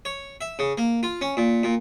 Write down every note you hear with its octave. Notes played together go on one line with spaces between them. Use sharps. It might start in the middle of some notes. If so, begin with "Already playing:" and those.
C#5
E5
C#3
A#3
F4
C#4
A#2
A#2